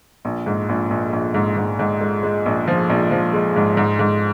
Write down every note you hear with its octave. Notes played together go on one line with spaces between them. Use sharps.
A#1
G#2
A#1
A#1
A#1
G#2
G#2
G#2
G#3
G#3
A#1
F3
A#1
F3
G#3
G#2
G#2
G#2